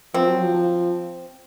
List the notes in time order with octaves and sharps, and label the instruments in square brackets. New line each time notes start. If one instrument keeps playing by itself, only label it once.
[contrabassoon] F3 [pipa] C4
[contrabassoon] F#3
F3
F3